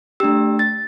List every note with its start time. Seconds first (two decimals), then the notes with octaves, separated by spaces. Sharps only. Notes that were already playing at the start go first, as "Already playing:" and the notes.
0.20 A3 D4 G4 E6
0.59 A6